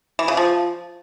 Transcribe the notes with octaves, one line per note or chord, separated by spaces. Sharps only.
E3
C#3
F3